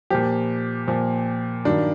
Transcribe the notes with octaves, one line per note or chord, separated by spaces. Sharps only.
A#2 F3 G4
A#2 F3
G2 D#3 F#3 D4